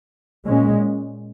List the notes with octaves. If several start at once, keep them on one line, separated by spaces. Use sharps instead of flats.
A#2 G#3 C#4